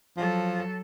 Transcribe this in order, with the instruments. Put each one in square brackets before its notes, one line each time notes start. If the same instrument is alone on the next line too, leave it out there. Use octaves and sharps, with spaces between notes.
[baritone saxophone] F3 [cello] F#3 A4